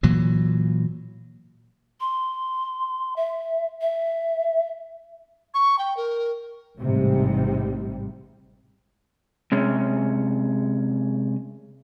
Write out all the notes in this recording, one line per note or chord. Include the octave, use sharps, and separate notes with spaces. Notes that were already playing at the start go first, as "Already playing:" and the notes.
A#2 E3 F#3
C6
E5
E5
C#6
G5
A#4
A1 G#2 C3 G3
C3 G#3 C#4